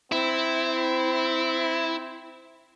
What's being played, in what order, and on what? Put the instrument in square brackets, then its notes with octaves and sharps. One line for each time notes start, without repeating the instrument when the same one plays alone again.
[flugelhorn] C4 [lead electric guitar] E4